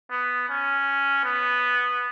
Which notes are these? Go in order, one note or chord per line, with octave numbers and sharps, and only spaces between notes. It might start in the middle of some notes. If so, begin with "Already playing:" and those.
B3
C#4
B3